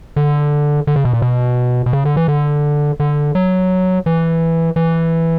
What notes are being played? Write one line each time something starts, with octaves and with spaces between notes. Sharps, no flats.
D3
D3
C#3
B2
A#2
B2
B2
C#3
D3
E3
D3
D3
F#3
E3
E3